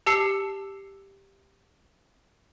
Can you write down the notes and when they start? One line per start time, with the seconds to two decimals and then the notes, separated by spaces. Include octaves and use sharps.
0.06 G4 A5 E6 C7 C#7